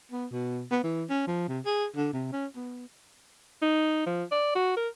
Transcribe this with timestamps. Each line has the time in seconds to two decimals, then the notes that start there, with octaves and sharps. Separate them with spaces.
0.11 B3
0.31 B2
0.71 B3
0.83 E3
1.09 C#4
1.27 F3
1.48 C3
1.65 G#4
1.96 D3
2.13 C3
2.32 C#4
2.56 B3
3.62 D#4
4.06 F3
4.31 D5
4.55 F#4
4.76 A#4